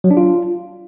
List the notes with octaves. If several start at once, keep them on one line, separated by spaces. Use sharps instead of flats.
F#3
D4
F4